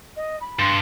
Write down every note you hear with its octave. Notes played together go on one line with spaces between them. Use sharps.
D#5
B5
G2 C6